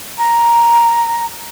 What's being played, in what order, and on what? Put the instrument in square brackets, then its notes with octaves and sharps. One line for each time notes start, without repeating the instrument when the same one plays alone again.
[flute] A#5